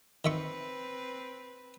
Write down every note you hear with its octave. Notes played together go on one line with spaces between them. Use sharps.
D#3 C4 B4 E5 C#6